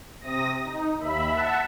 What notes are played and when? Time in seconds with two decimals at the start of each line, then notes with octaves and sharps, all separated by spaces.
0.21 C3 D#6 A#6
0.64 D#4
1.00 D#2 E5 B5
1.30 E5 F#5 A5